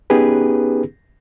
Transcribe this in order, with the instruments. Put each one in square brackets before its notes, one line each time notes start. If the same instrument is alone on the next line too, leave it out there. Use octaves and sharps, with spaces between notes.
[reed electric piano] B3 C#4 D#4 G4 G#4 B4